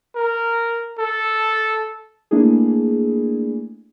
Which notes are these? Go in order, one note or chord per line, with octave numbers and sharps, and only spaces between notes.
A#4
A4
A3 A#3 D4 E4 G#4